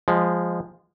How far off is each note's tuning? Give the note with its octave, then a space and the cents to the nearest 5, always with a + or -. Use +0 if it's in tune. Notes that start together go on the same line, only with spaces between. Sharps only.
F3 +0 G#3 -15